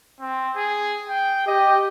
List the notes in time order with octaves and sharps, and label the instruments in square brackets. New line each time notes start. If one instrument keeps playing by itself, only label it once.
[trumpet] C4
G#4
G5
[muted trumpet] G4 [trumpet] D#5